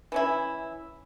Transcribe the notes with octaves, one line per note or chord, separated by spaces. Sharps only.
E3 C#4 E4